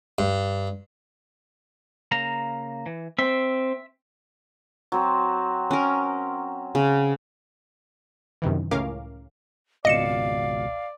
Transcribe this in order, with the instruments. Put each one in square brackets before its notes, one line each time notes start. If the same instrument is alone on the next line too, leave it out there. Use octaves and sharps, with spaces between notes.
[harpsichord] G2
[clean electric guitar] C#3 A#3 A#5
E3
[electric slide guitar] C4 [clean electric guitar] E5
[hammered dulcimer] F#3 C4
[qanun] C#4 A#4
C#3
[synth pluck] F#2 C3 D#3 E3
C#2 A2 C#4 A#4 F5 D6
[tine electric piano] G#1 C#2 B2 [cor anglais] D5 [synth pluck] D#5 C#7 E7 [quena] F5